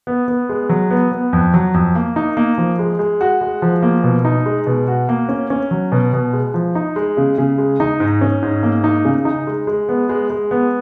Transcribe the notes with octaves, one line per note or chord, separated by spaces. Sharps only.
B3
B3
G#3
F#3
B3
B3
F2
F#3
F2
A#3
D#4
A#3
F3
G#3
G#3
F#4
G#3
F3
A#3
B2
D#4
G#3
B2
F#4
A#3
C#4
C#4
F#3
B2
B2
G#3
F3
D#4
G#3
C#3
C#3
G#3
D#4
G#2
C#4
G#2
A#3
D#4
C#3
D#4
G#3
G#3
B3
G#3
G#3
B3